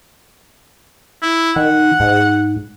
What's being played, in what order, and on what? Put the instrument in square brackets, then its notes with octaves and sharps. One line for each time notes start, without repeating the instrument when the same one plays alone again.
[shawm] E4
[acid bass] D#3 [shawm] F#5
[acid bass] G#2